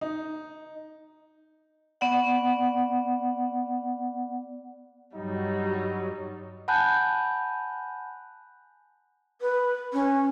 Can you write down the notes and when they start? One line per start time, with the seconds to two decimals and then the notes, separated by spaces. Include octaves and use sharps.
0.01 D#4
2.01 B3 D5 F#5
5.16 G2 F#3 G3 D#4
6.68 F#5 G#5 A5 B5 F#6 G6
9.41 B4
9.93 C#4